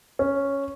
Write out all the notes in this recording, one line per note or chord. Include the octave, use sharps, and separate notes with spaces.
C#4